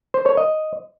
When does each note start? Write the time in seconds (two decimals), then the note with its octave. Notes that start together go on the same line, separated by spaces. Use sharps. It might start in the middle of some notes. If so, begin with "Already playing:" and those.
0.14 C5
0.26 C#5
0.37 D#5